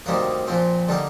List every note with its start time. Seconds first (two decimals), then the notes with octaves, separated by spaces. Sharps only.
0.06 D2 C3 D#3 G3 A#3
0.47 A#2 F3 C4
0.89 D3 G3 A#3 D#4